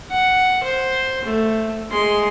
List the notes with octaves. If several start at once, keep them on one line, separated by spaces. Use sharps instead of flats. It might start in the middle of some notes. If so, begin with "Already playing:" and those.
F#5
C5
A3
G#3 C6